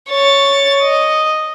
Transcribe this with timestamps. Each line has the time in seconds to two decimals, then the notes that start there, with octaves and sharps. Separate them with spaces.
0.10 C#5 A6
0.83 D#5